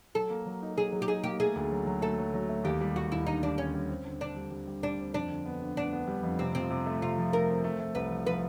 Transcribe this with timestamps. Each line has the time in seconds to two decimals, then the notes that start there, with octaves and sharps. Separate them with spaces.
0.15 F#3 A4
0.30 A#3
0.46 F#3
0.62 D#4
0.77 F#3 G#4
0.92 F#3
1.02 G4
1.08 D#4 G#4
1.24 A#3 G4
1.40 A3 G#4
1.56 D2
1.71 F#3
1.86 F#3
2.02 A3 A4
2.18 F#3
2.34 F#3
2.49 A3
2.64 D#2 G4
2.80 G3
2.96 G3 F#4
3.12 D#2 E4
3.27 D3 D#4
3.43 G3 D4
3.58 D3 C#4
3.74 G3
3.89 C4
4.05 D3
4.21 C4 D4
4.36 G3
4.51 G3
4.67 G3
4.83 G3 D4
4.99 C4
5.14 F2 D4
5.30 D3
5.46 B3
5.62 D3
5.77 B3 D4
5.93 B3
6.07 G3
6.23 F2
6.39 C3 C4
6.55 F3 C4
6.70 C3
6.86 A3
7.02 C3 F4
7.18 F3
7.33 A3 A#4
7.49 C4
7.64 A3
7.79 A3
7.95 C2 B4
8.11 F3
8.27 F3 B4